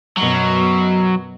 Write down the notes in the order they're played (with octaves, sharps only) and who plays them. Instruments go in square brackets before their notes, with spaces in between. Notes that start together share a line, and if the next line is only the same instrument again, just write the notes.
[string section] F#2 B2 [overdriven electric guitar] F#3